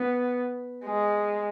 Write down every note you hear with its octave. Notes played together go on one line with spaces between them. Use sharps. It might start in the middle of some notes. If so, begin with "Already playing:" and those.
Already playing: B3
G#3